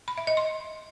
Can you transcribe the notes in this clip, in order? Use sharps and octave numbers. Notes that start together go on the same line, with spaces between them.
B5
E5
D#5
C6